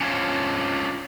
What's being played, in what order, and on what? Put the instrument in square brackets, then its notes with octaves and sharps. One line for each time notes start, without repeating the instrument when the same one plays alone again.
[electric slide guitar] C#4 D4 F4 C5 C#5